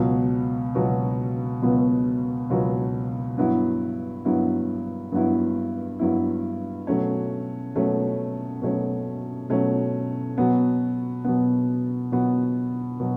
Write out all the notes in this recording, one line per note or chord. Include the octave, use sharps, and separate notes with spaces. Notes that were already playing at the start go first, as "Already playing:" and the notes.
Already playing: C#2 B2 F#3 B3
C#2 B2 F#3 B3
C#2 B2 F#3 B3
C#2 B2 F#3 B3
G2 F#3 B3 E4
G2 F#3 B3 E4
G2 F#3 B3 E4
G2 F#3 B3 E4
B2 F#3 A3 C#4
B2 F#3 A3 C#4
B2 F#3 A3 C#4
B2 F#3 A3 C#4
B2 F#3 B3
B2 F#3 B3
B2 F#3 B3
B2 F#3